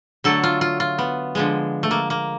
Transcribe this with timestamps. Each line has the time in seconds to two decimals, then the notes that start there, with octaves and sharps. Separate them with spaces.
0.24 D3 F#3 A3 A4
0.43 F4
0.61 F4
0.80 F4
0.98 B3
1.35 D3 F3 G#3
1.83 A3
1.91 A#3
2.10 A#3